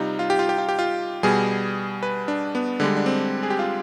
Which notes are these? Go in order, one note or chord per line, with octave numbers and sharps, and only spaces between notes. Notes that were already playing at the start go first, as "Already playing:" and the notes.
Already playing: C3 G3 D#4 F4
F4
G4
F4
G4
F4
G4
F4
B2 G3 G#4
B4
D4
B3
D3 G3 G#3
D4
C4
G#4
G4
F4